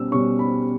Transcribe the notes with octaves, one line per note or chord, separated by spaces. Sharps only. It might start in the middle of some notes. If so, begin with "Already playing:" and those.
Already playing: B2 G3 C#4 E6
B2 G3 C#4 C#6
B5